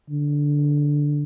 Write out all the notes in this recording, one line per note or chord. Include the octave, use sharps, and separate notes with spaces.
D3